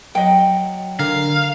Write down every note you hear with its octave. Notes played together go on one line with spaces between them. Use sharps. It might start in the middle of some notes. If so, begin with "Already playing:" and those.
F#3 D#5 G5
D3 A#4 F5